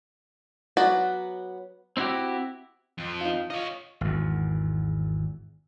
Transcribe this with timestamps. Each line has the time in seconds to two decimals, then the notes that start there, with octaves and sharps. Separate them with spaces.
0.77 F#3 B3 F#4 D5
1.97 C4 D#4 E4 F#4 G4
2.98 F2 C4
3.21 D#4 F4
3.50 F4 C#5 D#5
4.01 G#1 E2